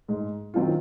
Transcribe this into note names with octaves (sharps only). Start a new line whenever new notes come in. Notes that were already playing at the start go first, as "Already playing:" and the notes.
G#2
D#3 F#3 C4 F4